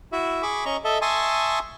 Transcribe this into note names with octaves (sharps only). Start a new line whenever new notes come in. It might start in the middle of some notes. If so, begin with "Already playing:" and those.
E4 F#4 E5
G#4 B5 C#6 D6
C#4 D#5 A#5 C#6
A4 D#5 E5
E5 G#5 A5 C6 C#6 D#6